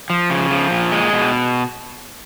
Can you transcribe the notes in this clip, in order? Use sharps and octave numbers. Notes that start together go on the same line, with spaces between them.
F3
C#3
F3
A#2
G#3
B2